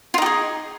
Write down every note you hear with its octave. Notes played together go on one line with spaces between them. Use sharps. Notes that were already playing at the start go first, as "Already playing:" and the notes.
D#4 F4 G4 G#4